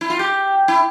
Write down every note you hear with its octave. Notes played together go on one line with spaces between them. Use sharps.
E4
F4
G4
E4